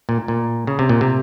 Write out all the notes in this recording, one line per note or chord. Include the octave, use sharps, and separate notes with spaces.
A#2
A#2
C#3
C3
A#2
C3